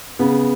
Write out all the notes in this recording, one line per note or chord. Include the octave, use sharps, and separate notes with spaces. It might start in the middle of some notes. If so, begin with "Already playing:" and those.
C#3 B3